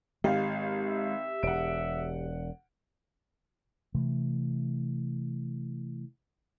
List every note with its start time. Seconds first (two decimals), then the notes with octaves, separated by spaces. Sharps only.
0.24 G#1 G#3 G4 F5
0.87 E5
1.43 E1 F#5 D7
3.95 C3 E3 A3